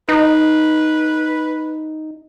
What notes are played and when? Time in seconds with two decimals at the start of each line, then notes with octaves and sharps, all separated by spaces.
0.09 D#4 B4